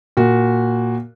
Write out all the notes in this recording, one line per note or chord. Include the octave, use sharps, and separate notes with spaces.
A#2 F#4